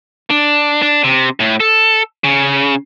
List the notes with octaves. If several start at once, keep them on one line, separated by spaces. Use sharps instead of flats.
D4
D4
C3
A2
A4
C#3